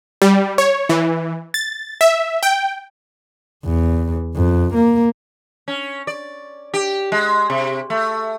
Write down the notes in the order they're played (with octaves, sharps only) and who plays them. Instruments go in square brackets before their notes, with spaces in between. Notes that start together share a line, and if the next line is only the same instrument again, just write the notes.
[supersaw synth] G3
C#5
E3
A6
E5
G5
[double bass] E2
F2
A#3
[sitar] C#4
D5
G4
G#3
C3
A3